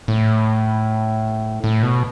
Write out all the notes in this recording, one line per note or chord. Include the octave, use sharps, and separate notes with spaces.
A2
A2
B2